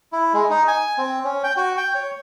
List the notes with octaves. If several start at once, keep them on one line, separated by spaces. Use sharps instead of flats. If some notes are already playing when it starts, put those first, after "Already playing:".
E4
G#3
D#4
G#5
C4
C#4
G5
F#4
G5
C#5